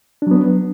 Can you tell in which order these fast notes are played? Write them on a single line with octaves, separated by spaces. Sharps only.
D4 F#3 B3